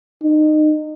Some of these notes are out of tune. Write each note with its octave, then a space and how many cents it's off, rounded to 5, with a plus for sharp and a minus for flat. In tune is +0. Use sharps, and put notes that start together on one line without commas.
D#4 -25